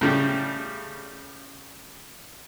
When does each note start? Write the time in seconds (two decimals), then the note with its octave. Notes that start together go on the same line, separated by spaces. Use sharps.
0.01 A2 C#3 G3